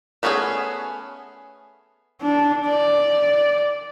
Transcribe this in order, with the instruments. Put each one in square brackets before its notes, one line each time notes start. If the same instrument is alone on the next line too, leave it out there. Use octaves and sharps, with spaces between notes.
[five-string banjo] A3 B3 C#4 F4 G#4
[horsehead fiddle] D4
D5